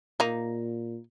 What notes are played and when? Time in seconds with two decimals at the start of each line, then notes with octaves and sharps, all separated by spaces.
0.20 A#2 A#3 D#4